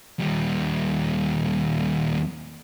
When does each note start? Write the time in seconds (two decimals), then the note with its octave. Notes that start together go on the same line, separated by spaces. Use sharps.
0.19 D#2 G3